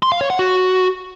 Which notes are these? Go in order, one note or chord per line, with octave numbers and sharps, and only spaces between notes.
C6
F5
C#5
F#5
F#4